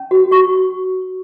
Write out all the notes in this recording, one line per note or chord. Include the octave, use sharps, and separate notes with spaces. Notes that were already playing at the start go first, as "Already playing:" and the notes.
Already playing: C#4
F#4
F#4 C#6